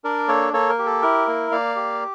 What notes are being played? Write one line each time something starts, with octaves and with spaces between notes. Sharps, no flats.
D4 A#4 D5
A#3 A4 C#5
A#3 A4 C#5
A#4
G4
A4
E4 A#4
A#3
A#3 D5 F5
G4